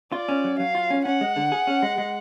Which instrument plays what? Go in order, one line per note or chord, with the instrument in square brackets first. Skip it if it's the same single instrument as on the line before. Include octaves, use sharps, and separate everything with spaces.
[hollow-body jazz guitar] F4 [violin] D5
[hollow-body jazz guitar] C#4
F#3
[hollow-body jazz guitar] F#3 [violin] F5
[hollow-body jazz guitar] F4
C#4
[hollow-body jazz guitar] C#4 [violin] F#5
[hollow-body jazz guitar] G#3
D3
G#4
C#4
G#3
G#3